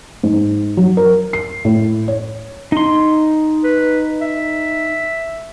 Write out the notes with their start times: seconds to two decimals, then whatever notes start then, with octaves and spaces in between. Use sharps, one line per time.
0.23 G#2
0.77 F#3
0.97 A#4
1.33 C7
1.65 A2
2.08 C#5
2.72 D#4 C6
3.64 B4
4.21 E5